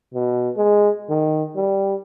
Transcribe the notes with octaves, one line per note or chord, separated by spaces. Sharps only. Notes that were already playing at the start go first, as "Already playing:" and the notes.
B2
G#3
D#3
G3